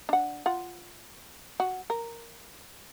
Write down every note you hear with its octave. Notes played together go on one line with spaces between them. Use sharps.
D4 F#5
F4 F#5
F#4
A#4